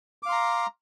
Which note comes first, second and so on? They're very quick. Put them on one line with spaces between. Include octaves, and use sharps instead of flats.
D6 F5 C6 A#5